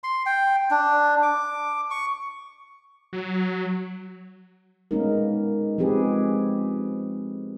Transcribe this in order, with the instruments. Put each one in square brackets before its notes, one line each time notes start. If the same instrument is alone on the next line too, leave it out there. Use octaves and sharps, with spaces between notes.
[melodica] C6
G5
D4
D6
C#6
[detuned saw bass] F#3
[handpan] G#3 A#3 B3 C#4 D#4 A#4
F3 G#3 C4 G4 G#4 B4